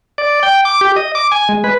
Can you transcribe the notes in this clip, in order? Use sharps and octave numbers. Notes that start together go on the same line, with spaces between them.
D5
G5
D6
G4
D#5
D6
G#5
G#3
B4